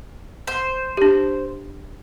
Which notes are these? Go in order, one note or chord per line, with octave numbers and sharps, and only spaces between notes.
C5
D4 G4